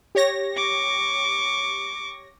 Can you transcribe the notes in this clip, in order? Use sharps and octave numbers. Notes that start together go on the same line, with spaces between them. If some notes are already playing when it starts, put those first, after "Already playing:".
G4 C#5 A#6
C#6 D6